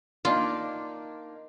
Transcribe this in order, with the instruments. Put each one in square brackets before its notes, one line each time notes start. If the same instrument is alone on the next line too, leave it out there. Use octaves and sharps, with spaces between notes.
[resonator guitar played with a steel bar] A#3 D4 D#4 [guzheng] F4